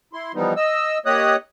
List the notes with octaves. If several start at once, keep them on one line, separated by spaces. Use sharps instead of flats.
E4 C6
E3 F3 G3 B3 D#4
D#5 E6
A#3 G4 C#5 D#5 D#6 F#6